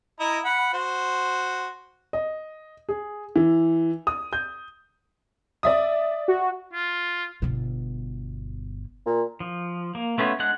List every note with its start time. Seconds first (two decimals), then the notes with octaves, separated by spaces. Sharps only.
0.20 E4 D#5 A#5
0.45 F#5 B5
0.73 F#4 C5
2.13 D#5
2.89 G#4
3.36 E3
4.07 D#6
4.33 G6
5.63 D5 E5 D#6
6.28 F#4
6.73 F4
7.42 G1 B2
9.06 A#2
9.40 F3
9.95 A#3
10.18 A3 B3 C#4 F4
10.40 G#3 D4 F#5 F#6